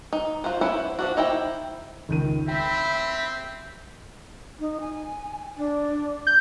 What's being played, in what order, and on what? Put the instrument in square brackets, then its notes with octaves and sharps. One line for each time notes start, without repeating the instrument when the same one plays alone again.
[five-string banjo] D#4
F4 F#4 C5
B3 C#4 E4 C5
F3 D4 F#4
D#4 E4 C5 G5
[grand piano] C#2 D#3 D#7
[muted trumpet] C4 [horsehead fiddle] E5 B5 [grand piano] G5
[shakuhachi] D#4
G#5
D4
[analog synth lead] G6